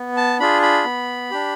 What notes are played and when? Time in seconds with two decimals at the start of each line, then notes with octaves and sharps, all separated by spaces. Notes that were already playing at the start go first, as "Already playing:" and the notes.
Already playing: B3
0.17 A5
0.39 D4 F4 G#4 B5
0.62 B5
0.85 B3
1.31 D4 G4